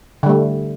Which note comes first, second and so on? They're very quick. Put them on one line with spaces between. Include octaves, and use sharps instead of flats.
D3 G3 A3